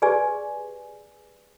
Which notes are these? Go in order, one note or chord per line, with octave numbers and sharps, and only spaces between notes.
G4 G#4 B4 D5 G#5